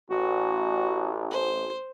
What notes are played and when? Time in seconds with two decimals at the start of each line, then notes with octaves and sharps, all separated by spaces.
0.10 A1 F#4
1.31 C5